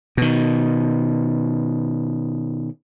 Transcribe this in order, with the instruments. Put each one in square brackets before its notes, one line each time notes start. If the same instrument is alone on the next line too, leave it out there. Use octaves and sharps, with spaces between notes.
[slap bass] B2 D#3